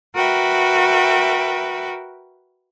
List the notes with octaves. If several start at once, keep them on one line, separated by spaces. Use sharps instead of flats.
F#4 A#4 B4 E5 G5